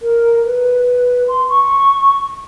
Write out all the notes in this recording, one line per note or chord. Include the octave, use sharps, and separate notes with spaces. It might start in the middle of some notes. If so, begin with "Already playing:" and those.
A#4
B4
C6
C#6